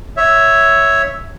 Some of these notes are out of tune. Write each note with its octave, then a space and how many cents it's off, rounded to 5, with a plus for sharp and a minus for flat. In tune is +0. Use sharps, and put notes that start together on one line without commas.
C#5 +0 E5 -5